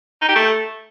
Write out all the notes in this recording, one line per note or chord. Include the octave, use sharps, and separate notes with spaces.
D#4
G4
A3